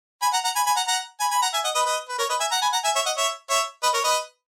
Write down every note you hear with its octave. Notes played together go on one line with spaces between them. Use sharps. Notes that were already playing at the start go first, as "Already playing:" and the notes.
G#5 B5
F#5 A#5
F#5 A#5
G#5 B5
G#5 B5
F#5 A#5
F#5 A#5
G#5 B5
G#5 B5
F#5 A#5
E5 G#5
D#5 F#5
B4 D#5
B4 D#5
B4
A#4 C#5
B4 D#5
E5 G#5
F#5 A#5
G#5 B5
F#5 A#5
E5 G#5
C#5 E5
D#5 F#5
C#5 E5
C#5 E5
B4 D#5
A#4 C#5
B4 D#5